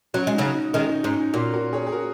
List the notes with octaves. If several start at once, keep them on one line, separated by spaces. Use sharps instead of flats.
F#3 C#4 F#4
G#3
C#3 F#3 D#4
D#4
D#3 G#3 C#4
D#4
G#2 C#4
D#4
A#2 C#4 F#4
F#4 A#4
G#4 C#5
G#4
F#4 A#4